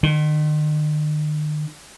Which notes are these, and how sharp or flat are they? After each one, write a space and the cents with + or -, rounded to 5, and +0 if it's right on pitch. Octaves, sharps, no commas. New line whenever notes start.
D#3 -45